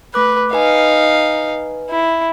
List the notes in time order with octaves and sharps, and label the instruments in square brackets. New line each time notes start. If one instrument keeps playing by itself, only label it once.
[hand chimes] A3 D6 F#6 [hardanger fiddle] B4
[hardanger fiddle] D#4 F5 [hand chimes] B4 G#5
[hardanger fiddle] E4